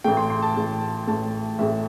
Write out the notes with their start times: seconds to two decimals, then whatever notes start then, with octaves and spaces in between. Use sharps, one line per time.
0.04 A1 A2 A3 G5
0.17 C6
0.30 C6
0.42 A5
0.56 A1 A2 A3
1.07 A1 A2 A3 A5
1.59 A1 A2 A3 E5